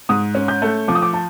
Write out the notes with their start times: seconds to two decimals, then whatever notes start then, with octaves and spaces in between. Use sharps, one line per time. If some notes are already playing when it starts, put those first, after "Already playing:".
0.09 G#2 D#6
0.35 C#4
0.48 G6
0.62 A3
0.88 F3 D6
0.95 D#6
1.02 D6
1.13 A5